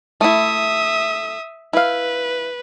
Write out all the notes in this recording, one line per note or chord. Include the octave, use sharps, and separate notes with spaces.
A3 E4 E5 D#6
E4 B4 F5